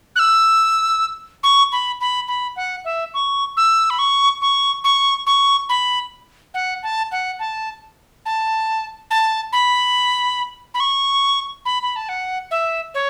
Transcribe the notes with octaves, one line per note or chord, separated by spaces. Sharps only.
F#6
E6
C#6
B5
B5
B5
F#5
E5
C#6
E6
B5
C#6
C#6
C#6
C#6
B5
F#5
A5
F#5
A5
A5
A5
B5
B5
C#6
B5
B5
A5
F#5
E5
C#5